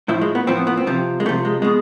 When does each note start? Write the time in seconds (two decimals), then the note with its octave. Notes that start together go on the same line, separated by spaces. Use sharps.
0.08 A2 F3 E4
0.21 G#3
0.35 B3
0.47 A2 F3 C4
0.57 B3
0.67 B3
0.77 C4
0.87 C3 F3
1.20 G#3
1.26 F3 A3
1.29 C3
1.45 G#3
1.62 B2 G#3